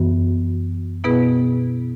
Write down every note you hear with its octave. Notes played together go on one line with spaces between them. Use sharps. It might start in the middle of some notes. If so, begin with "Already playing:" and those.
Already playing: F#2 E3 B3 F#4
B2 B3 E4 G#4 B4